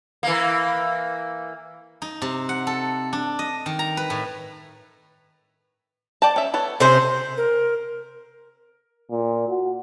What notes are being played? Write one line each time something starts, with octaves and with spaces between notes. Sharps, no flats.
E3 A#3
D#4
C3
F#5
A4
D4
D#5
D#3
A#5
B4
A2
D5 G5 A5
C#4 E5
B3 A4 C#5
C3 C#4 G#4 C5
A#4
A#2
F#4